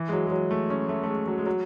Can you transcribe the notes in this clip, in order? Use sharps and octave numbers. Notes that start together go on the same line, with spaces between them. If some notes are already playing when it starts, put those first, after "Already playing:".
Already playing: E3
G#3
F#3
G#3
F#3
A3
C#4
A3
A3
G#3
F#3
G#3
F#3